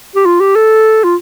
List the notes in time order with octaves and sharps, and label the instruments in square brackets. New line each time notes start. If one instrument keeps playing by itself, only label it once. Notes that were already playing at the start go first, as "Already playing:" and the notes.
[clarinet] G4
F4
G4
A4
F4